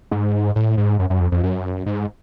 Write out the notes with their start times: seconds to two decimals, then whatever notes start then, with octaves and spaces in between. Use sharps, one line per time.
0.11 G#2
0.56 A2
0.77 G#2
0.99 F#2
1.10 F#2
1.20 F2
1.32 F2
1.43 F#2
1.86 G#2